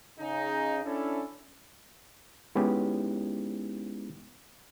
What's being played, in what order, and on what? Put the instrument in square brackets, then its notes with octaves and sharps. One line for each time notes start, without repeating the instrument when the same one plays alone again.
[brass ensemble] C#3 D#4
C#4 D4 E4 A4
[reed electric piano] G#3 B3 C#4 D#4 E4 G4